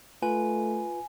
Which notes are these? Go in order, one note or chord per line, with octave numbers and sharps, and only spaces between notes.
A3 F4 B4 G#5